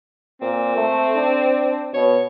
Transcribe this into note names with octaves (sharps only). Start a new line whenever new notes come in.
A#2 C4
A3
D4
B2 C#5